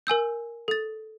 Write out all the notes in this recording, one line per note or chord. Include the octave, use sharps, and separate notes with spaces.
A#4 G#5 E6 G6
A4 A6